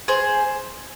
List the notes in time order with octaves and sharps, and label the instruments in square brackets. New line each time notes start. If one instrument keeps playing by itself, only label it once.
[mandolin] G#4 C5